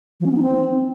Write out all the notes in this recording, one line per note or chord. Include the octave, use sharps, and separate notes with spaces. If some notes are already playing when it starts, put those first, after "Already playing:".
F3
C#4
B3
D#4
C4